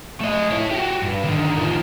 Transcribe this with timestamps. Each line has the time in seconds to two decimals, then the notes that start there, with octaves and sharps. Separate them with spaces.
0.21 A3 D#5
0.52 E4 C#5
0.71 F#4 G4
1.02 G2
1.24 D3 D#3
1.58 D#3 F3